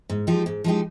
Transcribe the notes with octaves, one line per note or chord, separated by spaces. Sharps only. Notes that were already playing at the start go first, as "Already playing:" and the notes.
G#2
F3 G#3 D#4 G4
G#2
F3 G#3 D#4 G4